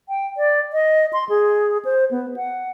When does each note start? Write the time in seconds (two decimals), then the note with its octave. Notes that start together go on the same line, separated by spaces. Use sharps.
0.09 G5
0.37 D5
0.73 D#5
1.13 C6
1.29 G#4
1.85 C5
2.11 B3
2.36 F#5